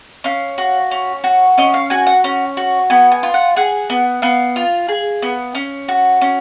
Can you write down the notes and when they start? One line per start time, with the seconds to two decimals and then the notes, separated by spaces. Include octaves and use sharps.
0.24 C#4 F5
0.58 F#4
0.91 C#4
1.24 F#4
1.58 C#4 D#5
1.74 F5
1.90 F#4 G#5
2.07 F#5
2.24 C#4
2.57 F#4
2.90 B3 G#5
3.12 G#5
3.23 F4
3.34 F#5
3.57 G#4 F#5
3.90 B3
4.22 B3 F5
4.56 F4
4.89 G#4
5.22 B3
5.55 C#4
5.88 F#4
6.22 C#4